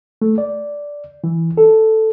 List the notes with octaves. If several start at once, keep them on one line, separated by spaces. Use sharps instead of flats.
A3
D5
E3
A4